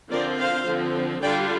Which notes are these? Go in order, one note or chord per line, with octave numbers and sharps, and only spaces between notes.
D3 F3 C4 F4 A#4 D5
C5 F5
D3 F3 C4
D3 G3 D4 F4 D5 G5